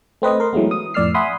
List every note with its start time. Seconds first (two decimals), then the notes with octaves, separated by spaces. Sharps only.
0.22 A3 C4 B4 D#5
0.40 A#4 C6
0.53 E3 F#3 G#3 A3 B3
0.71 D#6
0.94 F2 A2 D5 E6 F6 C7
1.14 E5 F#5 G#5 B5 C6 D#6